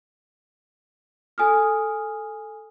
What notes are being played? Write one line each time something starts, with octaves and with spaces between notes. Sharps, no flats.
A4 G#5 D#6 F6